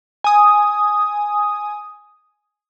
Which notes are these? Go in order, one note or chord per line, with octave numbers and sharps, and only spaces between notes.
G#5 D#6